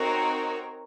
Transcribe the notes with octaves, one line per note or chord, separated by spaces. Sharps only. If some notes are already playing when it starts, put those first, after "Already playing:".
Already playing: C4 D#4 F#4 A#4 C#5